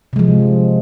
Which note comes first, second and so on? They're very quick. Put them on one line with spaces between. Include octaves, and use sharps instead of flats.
C3 G#3 F3